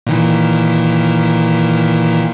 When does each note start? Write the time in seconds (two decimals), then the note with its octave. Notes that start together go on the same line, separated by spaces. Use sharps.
0.07 A#2 D#3 E3